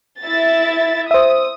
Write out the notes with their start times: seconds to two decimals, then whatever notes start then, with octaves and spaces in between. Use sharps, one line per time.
0.22 E4 E5 A6
1.11 C5 E5 D#6